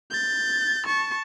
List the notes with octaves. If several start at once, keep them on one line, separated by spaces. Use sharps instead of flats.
G6 A6
A5 C#6